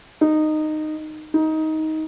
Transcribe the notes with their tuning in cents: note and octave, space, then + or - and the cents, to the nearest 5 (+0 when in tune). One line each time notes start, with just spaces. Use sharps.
D#4 -15
D#4 +15